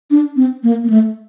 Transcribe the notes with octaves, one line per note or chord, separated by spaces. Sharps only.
D4
C4
A#3
A#3
A3